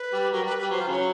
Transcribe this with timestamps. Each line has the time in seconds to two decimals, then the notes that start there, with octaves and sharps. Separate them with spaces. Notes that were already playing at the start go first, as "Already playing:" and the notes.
Already playing: B4
0.13 G3
0.33 F#3 A#4
0.42 G3 B4
0.59 G3 B4
0.71 F#3 C5
0.80 F3
0.88 C#3 F#3 C#5